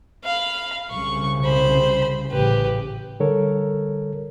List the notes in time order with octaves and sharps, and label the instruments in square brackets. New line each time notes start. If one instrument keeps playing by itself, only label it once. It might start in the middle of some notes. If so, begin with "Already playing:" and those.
[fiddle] F5 B5
[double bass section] C2 C#3 [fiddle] C#6
[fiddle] C5 B5
[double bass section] A1 C#3 [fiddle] G4 B4
[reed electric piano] D3 G3 A4 A#4 C#5